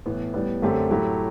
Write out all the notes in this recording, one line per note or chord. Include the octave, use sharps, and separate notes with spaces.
A2 E3 B3
A2 G3 B3
F#2 D3 A3 C4 G4
A2 F#3 A3 E4 G4